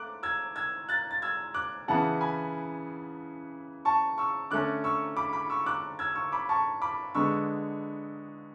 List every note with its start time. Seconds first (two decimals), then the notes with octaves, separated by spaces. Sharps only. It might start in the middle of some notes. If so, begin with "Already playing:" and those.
Already playing: A3 D6 F#6
0.23 E6 G#6
0.56 E6 G#6
0.89 F#6 A6
1.11 A6
1.22 E6 G#6
1.54 D6 F#6
1.88 C#3 E3 B3 F#5 A5
2.21 G#5 B5
3.85 A5 C#6
4.18 C#6 E6
4.51 D3 A3 C#4 D6 F#6
4.84 C#6 E6
5.17 B5 D6
5.33 B5 D6
5.50 C#6 E6
5.66 D6 F#6
5.99 E6 G#6
6.15 C#6 E6
6.32 B5 D6
6.49 A5 C#6
6.82 B5 D6
7.15 D3 G#3 B3 C#6 E6